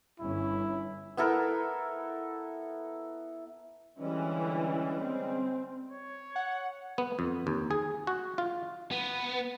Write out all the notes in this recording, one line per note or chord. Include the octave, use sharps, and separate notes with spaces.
G1 C#4 E4
B3 E4 A4 A#4
D3 E3 G3 G#3 C#4
C4
C#5
F#5
B3
F2
D#2
G#4
F#4
F4
B3